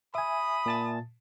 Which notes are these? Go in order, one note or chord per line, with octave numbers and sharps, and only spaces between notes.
E5 G#5 B5 D#6
A#2 A5 A6